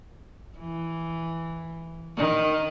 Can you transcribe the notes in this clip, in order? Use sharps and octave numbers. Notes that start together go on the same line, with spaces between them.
E3
D#3